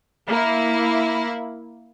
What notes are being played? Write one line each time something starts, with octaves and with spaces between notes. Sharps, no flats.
A#3 E4